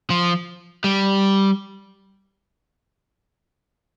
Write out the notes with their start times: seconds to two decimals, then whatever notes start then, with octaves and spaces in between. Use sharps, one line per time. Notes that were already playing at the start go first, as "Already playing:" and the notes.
0.10 F3
0.84 G3